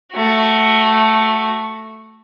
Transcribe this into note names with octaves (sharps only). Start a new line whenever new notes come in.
A3 F#4